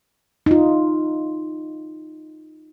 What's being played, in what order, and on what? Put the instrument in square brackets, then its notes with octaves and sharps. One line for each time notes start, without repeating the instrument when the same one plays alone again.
[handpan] D#4 F4